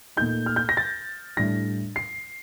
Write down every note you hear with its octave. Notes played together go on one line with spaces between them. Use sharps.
A#2 A3 D#4 G6
F6
G6
A#6
A6
A2 G3 D4 A#6
C7